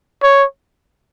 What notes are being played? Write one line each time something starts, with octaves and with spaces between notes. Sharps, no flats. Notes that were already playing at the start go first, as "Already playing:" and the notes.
C#5